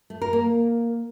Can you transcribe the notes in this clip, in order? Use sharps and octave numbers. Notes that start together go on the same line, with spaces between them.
A3
A#4
A#3